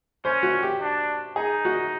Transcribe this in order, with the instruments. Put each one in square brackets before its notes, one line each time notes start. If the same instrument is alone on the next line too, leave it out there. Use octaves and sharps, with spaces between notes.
[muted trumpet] C#4 [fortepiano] C5
[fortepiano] F#4
G4
[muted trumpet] D4
[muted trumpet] D#4 [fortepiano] G#4
[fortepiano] F#4